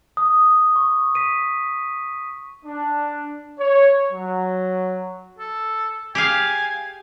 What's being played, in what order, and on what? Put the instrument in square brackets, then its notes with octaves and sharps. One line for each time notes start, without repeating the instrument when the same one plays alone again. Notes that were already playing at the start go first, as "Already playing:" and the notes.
[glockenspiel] D#6
C#6
B6 D#7
[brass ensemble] D4
C#5
F#3
[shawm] A4
[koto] G4 G#4 F5 [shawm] G#5